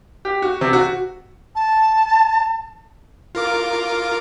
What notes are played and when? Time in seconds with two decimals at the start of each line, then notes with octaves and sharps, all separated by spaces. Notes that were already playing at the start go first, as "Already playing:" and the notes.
0.25 G4
0.42 F#4
0.61 C3
0.73 F#4
1.55 A5
3.35 F4 A#4 D6